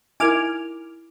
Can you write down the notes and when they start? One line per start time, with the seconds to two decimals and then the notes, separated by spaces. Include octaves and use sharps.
0.20 D#4 E4 A#4 G#5 D6 F6